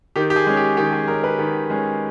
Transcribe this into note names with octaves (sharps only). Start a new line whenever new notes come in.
D#3 G4
G4
G#4
G#3 C#4
G4
D#3 G4
G#4
G#3 C#4 A#4
B4
D#3
G#3 C#4